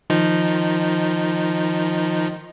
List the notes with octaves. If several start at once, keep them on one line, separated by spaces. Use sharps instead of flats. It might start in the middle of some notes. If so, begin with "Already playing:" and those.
D#3 F3 D#4